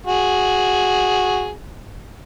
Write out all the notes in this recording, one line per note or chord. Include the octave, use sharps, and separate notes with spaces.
F#4 G#4